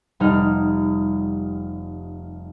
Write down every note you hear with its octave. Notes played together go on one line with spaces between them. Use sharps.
F1 G3 D#4 F6